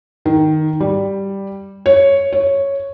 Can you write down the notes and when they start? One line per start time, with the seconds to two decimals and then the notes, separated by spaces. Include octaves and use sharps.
0.25 D#3
0.80 G3
1.86 C#5
2.33 C#5